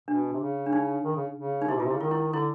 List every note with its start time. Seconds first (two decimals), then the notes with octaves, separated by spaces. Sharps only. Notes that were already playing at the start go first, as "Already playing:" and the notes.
0.08 B2 D4
0.33 C3
0.40 C#3
0.66 D4
0.73 D#4
1.05 D#3
1.16 C#3
1.36 C#3
1.62 D#4
1.68 C3 E4
1.77 B2
1.80 F4
1.85 C3
1.91 C#3 E4
2.00 D#3 F4
2.11 E4
2.33 D3 E4